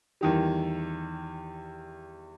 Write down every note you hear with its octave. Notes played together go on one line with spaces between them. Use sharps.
E2 D#3 G3